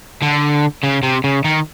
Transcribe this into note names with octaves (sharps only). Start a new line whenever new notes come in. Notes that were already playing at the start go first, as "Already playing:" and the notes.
D3
C#3
C3
C#3
D#3